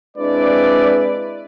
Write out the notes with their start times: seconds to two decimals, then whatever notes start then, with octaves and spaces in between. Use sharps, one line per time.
0.18 G#3 C4 D4 E4 B4 D5